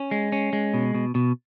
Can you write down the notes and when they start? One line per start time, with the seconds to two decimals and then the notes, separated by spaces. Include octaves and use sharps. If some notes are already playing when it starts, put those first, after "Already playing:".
Already playing: C#4
0.11 G#3
0.32 C#4
0.53 G#3
0.74 B2
0.95 B2
1.15 B2